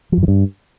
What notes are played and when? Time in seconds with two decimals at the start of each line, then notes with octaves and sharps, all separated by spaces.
0.12 F3
0.17 F#2
0.23 E3
0.28 G2